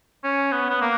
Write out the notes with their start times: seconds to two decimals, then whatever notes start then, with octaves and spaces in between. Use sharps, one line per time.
0.24 C#4
0.52 B3
0.69 B3
0.81 A#3